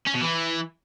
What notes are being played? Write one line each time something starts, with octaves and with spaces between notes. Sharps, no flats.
C#4
B2
E3